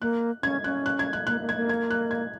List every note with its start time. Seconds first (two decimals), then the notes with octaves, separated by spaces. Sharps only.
0.01 A#3 F#6
0.43 C#4 G#6
0.64 C#4 F#6
0.86 F#6
0.99 G#6
1.13 F#6
1.27 A#3 F#6
1.41 A#3
1.49 G#6
1.56 A#3
1.69 G#6
1.90 F#6
2.11 G#6